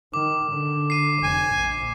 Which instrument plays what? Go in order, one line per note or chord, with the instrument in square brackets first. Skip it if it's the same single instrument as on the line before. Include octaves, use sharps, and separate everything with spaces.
[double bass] D#3 [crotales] D6
[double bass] D3
[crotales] C7 D#7
[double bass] F1 [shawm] G#5
[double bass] A#1 A#2